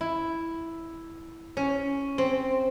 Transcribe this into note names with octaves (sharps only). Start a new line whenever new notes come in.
E4
C#4
C4